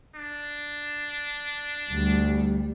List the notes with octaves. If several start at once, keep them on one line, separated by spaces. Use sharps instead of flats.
D4
D2 G3